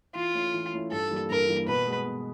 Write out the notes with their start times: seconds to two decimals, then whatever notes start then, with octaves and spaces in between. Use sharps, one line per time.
0.15 E3 F4
0.34 A3 C#4 E4
0.54 E3
0.73 A3 C#4 E4
0.92 G2 A4
1.11 E3 G3 A#3
1.30 G2 A#4
1.49 E3 G3 A#3
1.68 B2 B4
1.87 G#3 B3
2.06 B2